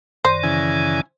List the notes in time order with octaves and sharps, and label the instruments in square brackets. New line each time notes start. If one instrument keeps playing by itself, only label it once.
[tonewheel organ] F#2 D#3 D5 [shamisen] C5
[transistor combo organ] C#3 E3 G#5